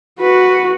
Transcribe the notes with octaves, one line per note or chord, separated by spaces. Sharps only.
F#4 B4